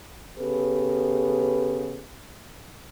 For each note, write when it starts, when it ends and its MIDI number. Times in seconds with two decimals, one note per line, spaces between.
0.38 2.05 49
0.38 2.05 59
0.38 2.05 67
0.38 2.05 69
0.38 2.05 71